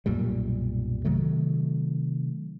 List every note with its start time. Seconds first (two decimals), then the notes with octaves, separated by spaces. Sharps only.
0.06 B1 F#2 A#2 G3
1.05 C3 D#3 F#3 A3